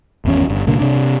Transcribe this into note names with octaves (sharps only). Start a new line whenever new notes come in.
G#1 E2 C#4
G1
C2 A#2 D3 A#3
C3 D4